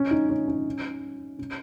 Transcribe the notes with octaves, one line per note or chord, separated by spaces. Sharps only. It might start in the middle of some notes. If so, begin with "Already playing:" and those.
Already playing: C#4
D#4
C#4
C#4
C#4